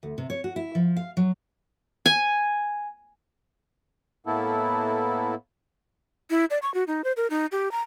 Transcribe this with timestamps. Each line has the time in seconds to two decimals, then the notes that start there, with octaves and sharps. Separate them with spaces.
0.03 D2
0.18 C3
0.30 C#5
0.44 F#4
0.56 E4
0.75 F3
0.96 F5
1.17 F#3
2.06 G#5
4.26 A2 A#3 B3 E4 A4
6.30 E4
6.50 D5
6.62 C#6
6.74 F#4
6.87 D#4
7.04 C5
7.17 A#4
7.30 D#4
7.52 G4
7.72 A#5